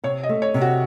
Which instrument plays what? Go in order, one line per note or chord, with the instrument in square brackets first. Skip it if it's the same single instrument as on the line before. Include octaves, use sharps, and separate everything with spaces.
[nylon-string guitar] C3 [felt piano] C#5
[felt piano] D#5
[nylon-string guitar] A3
[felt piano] C#5
[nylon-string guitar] C3
[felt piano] F#4